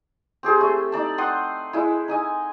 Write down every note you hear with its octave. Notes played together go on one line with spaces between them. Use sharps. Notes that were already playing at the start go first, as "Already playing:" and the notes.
C4 G4 G#4 C5
A3
D#4 D5 A5
F#5 G5 C6 D#6
G#3 E4
D#4 D#5 G#5